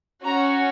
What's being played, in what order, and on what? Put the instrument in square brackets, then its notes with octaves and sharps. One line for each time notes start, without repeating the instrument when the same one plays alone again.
[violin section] C#4 F#4 A#5